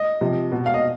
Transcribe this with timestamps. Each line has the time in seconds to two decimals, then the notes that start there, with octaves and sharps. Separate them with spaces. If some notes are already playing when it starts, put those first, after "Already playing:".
Already playing: D#5
0.21 C3 F3
0.52 B2
0.66 F5
0.74 D#5